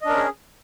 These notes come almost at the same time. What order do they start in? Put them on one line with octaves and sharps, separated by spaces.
D#5 D4 A#4 C#4 G#4